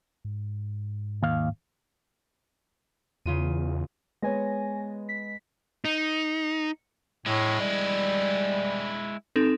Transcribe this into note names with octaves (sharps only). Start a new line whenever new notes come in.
G#2
D#2 F5
E2 C#3 F4 D#7
G#3 B3 C#5 G#5 A#6
B6
D#4
A2 G#3 E4
G3
C4 D#4 A4